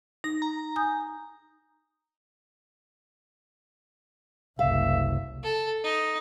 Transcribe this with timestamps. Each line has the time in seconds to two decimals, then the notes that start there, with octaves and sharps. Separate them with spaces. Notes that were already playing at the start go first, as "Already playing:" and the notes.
0.24 D#4 A#6
0.42 A#5
0.76 G#5 D#6 G6
4.59 F#1 C2 E5 F5
5.43 A4
5.84 D#4